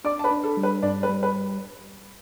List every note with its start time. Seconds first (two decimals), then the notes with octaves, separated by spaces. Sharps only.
0.04 D4 D5 D6
0.19 A5
0.24 B4 B5
0.31 D4
0.43 A4
0.57 G3
0.63 B4
0.82 G2 D4 D5
1.03 B4
1.09 G3
1.23 B4